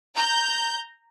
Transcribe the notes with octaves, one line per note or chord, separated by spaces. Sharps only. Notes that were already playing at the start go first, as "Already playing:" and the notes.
A#5 G6